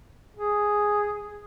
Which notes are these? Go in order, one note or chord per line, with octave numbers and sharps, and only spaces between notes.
G#4